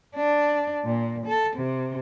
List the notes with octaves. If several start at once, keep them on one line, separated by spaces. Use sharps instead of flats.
D4
A#2
A4
C3